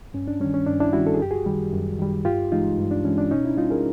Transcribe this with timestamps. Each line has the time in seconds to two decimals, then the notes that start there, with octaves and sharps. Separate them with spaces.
0.14 G2 C#4
0.28 D4
0.40 D#3 G3 C#4
0.54 C#4
0.66 G2 D4
0.80 D4 E4
0.93 D#3 G3 E4 F#4
1.06 A4
1.14 G#4
1.20 F#2 G4
1.31 F#4 G#4
1.46 D#3 G3
1.73 F#2
1.99 D#3 G3
2.25 G2 F4 G4
2.52 E3 G#3 D#4 F4
2.78 G2
2.91 D4
3.05 E3 G#3 C#4
3.18 D4
3.31 B2 C#4 D#4
3.45 D4 E4
3.57 G3 D#4 F4
3.70 G#4 A#4